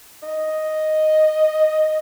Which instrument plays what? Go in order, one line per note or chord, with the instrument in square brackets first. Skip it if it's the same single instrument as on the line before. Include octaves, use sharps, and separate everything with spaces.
[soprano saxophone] D#5